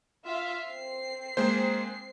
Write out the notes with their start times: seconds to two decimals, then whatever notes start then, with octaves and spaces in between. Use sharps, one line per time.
0.24 F4 E5 F5
0.67 C4 C7
1.37 G#3 A#3 C5